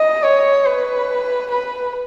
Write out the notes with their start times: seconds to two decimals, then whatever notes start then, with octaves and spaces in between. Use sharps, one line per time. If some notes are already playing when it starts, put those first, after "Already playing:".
Already playing: D#5
0.23 C#5
0.66 B4
1.51 B4